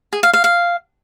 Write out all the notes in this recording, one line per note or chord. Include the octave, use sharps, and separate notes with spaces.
G#4
F5
F5
F5